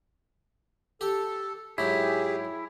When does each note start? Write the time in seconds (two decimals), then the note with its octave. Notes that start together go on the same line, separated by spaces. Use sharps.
1.01 G4 A4
1.78 G#2 F#3 E4 G4 G#4